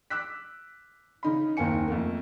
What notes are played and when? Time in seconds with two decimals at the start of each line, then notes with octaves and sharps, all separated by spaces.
0.10 D6 E6 F#6 B6
1.23 C#3 D#4 B5
1.57 F#1 D#2 A#3 C4 G#5 C#7
1.88 F2 A3 A#3